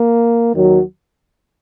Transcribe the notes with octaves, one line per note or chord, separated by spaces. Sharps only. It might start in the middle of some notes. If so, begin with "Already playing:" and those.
Already playing: A#3
D#2 D#3 F#3